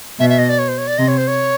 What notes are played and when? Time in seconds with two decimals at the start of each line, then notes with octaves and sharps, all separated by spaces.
0.19 B2 E5
0.30 E5
0.38 D#5
0.49 D5
0.59 C#5
0.68 C5
0.78 C#5
0.87 D5
0.98 C3 D#5
1.08 C#5
1.18 C5
1.28 C#5